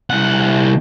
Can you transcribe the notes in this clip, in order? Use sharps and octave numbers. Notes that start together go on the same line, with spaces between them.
C2 F#5